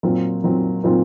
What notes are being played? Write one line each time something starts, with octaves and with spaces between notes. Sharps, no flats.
A#2 F#3 C4 F4
A#2 F#3 C4 F4
A#2 F#3 C4 F4